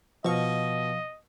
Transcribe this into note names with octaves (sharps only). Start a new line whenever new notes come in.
B2 F3 D#5 F5 C#6